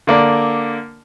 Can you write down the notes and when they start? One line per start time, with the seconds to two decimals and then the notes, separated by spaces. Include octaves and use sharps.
0.07 D3 A#3 D5